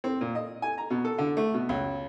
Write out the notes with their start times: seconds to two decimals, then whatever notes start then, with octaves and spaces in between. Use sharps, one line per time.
0.04 C4
0.21 A#2
0.35 D#5
0.62 G#5
0.78 A#5
0.90 B2
1.05 A4
1.18 D3
1.37 A3
1.54 B2
1.69 C#2